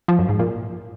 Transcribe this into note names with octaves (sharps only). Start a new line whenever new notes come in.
F3
F#2
G#2
A#2